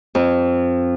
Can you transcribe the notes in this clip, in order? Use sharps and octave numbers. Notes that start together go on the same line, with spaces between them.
F2